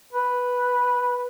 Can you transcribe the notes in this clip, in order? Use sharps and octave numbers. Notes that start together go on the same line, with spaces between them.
B4